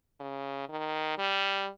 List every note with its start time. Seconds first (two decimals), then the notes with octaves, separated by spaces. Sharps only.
0.20 C#3
0.69 D#3
1.18 G3